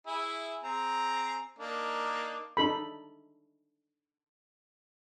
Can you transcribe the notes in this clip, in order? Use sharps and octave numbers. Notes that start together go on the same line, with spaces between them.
E4 G#4 E5
C4 G#4 A#5
A#3 D4 D#4
D4 D#4 A4 B5